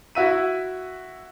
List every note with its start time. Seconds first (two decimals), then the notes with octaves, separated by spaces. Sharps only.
0.15 E4 F#4 E5 D#7